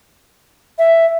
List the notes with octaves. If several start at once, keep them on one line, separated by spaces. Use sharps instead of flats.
E5